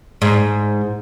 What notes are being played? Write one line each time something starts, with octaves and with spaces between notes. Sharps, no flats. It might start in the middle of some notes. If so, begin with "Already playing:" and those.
G#2